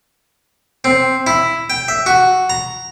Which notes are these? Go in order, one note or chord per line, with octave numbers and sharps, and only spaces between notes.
C4
E4
G5
E5
F#4
A#5